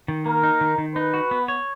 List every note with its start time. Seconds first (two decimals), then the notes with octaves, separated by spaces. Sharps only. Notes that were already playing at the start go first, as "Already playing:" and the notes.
0.08 D#3
0.26 A#3 A#4
0.43 D#4
0.61 D#3
0.78 D#3
0.95 D#4 B4
1.14 F#4
1.31 B3
1.48 C#5